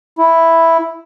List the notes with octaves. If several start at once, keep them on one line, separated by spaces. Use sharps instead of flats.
E4